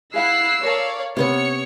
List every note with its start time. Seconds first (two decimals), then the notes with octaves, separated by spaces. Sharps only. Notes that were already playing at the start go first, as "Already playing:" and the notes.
0.14 E4 G#4 F5 F#5 E6 F#6 C7
0.63 A4 A#4 C#5 D5 F5 A5
1.17 C3 B3 C#4 C#5 C#7